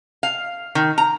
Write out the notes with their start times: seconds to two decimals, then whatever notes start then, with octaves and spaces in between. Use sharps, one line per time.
0.23 F5
0.75 D#3
0.98 A#5